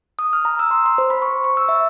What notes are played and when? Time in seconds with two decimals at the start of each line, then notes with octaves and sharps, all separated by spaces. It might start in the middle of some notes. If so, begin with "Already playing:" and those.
0.19 D#6
0.33 F6
0.45 A#5
0.59 E6
0.71 C6
0.86 C6
0.98 C5
1.10 B5
1.22 C#6
1.44 C#6
1.57 E6
1.68 E5